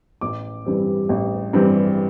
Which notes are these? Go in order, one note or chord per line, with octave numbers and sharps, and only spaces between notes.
A1 D6
G2 E3 G3 C4
A1
G2 E3 G3 C4